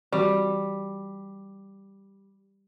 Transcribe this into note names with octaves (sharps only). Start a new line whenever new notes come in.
E3 G3 C4 F#4